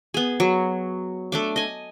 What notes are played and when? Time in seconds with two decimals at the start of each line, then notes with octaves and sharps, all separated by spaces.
0.14 B3 G#4
0.40 F#3
1.32 A3 D4 D6
1.56 D#5 G#5